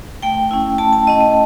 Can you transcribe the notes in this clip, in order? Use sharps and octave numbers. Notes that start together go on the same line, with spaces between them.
A3 G5
C#4 E4
A3 A5
A5
C#4 E4 D#5
D#5